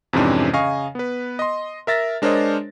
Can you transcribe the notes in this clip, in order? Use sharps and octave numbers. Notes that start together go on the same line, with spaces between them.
F2 G#2 C3 E3 C#4 D4
C#3 D#5 F5 G#5 C#6
B3 B4
D#5 C6
A#4 E5 A6 A#6
G#3 D4 A#4 C5 C#5 D#5